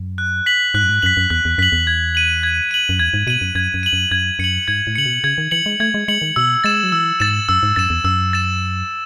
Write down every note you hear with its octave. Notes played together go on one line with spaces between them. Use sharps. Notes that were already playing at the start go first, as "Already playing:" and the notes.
Already playing: F#2
F#6
B6 F#7
G#2 F#6
F#2
G#2
F#2 B6 F#7
F#2
E2 F#6
E2
F#2 B6 F#7
E2
G#6
D#7 F#7
G#6
D#7 F#7
F#2
E2 G#6
G#2
B2 D#7 F#7
F#2
F#2 G#6
F#2
D#7 F#7
F#2
F#2 G#6
F#2 C#7 F#7
G#2 G#6
A2
C#3 C#7 F#7
B2
C#3 G#6
D#3
E3 C#7 F#7
G#3
A3 G#6
G#3
G#3 C#7 F#7
D#3
B2 E6
G#3 A6 E7
F#3
E3 E6
G#2 A6 E7
F#2 E6
G#2
F#2 A6 E7
E2
F#2 E6
A6 E7